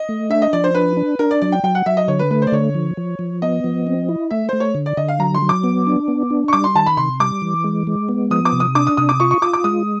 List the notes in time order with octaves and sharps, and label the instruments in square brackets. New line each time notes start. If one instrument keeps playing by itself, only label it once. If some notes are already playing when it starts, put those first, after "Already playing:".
Already playing: [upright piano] D#5
[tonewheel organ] A3
[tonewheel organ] D4 [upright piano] E5
[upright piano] D#5
[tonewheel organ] F3 [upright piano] D5
[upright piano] C5
[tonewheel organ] D4 [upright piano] B4
[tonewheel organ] D4
[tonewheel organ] D4 [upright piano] A#4
[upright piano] D5
[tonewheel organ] F#3 [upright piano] D5
[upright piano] G5
[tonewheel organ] F#3 [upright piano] G5
[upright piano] F#5
[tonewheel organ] F#3 [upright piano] E5
[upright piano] D#5
[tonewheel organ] D3 [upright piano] C#5
[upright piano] B4
[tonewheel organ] A3 [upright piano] B4
[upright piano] C5
D5
[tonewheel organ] D3 [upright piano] C#5
[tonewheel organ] F3
F3
F3
[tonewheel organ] B3 [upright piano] D#5
[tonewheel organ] F3
C4
E4
[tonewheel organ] A3 [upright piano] E5
[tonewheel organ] A3 [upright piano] C5
[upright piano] C#5
[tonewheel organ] D3
[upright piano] D5
[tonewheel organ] D3 [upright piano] D#5
[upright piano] F5
[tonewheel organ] F#3 [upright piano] A#5
[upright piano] C6
[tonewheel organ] F#3
[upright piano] D6
[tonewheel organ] B3
D4
B3
D4
[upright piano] C#6
[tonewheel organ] G3 [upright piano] D6
[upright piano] C6
[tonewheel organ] D#3 [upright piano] A5
[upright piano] B5
[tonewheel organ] C3 [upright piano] C6
[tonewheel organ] G3 [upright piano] D6
[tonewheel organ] E3
G#3
G#3
B3
[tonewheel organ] F3 [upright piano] D#6
[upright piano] D6
[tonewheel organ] C3
[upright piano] D#6
[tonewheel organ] D4 [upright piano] D6
[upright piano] D#6
[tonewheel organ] C3 [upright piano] D#6
[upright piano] D6
[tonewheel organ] F4 [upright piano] C#6
[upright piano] C#6
[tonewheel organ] F4 [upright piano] D6
[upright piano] D6
[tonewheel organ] G#3 [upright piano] D#6